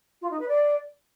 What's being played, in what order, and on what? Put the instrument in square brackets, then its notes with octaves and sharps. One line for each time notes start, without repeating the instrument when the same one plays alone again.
[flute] F4
D#4
B4
D5